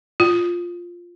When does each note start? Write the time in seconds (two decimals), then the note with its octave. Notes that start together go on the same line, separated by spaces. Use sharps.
0.20 F4